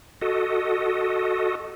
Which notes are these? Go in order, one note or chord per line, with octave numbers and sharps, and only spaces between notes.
F#4 A4 D#5